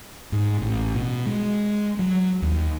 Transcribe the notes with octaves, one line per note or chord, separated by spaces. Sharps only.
G#2
A1
B2
G#3
F#3
D#2